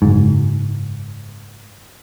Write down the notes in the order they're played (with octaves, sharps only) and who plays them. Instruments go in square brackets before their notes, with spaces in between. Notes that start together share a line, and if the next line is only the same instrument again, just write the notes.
[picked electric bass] F#1 G#2